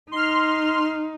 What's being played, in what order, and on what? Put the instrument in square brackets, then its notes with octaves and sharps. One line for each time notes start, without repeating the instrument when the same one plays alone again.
[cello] D#4 [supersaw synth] C6 F6